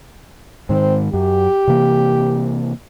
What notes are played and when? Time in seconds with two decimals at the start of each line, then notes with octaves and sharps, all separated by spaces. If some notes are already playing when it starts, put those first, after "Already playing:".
0.69 G#2 D#3 C4
1.13 F#2 G4
1.68 C3 E3 A#3